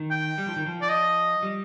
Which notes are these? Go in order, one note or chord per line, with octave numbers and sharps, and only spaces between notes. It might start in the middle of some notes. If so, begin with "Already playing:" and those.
Already playing: D#3
G5
G3
F3
D#3
F3
D5
D#5
G3